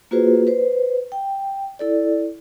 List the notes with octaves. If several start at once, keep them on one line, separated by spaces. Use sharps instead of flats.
A#3 F4 F#4 G#4 B4 C5
B4 C5
G5
E4 A4 D5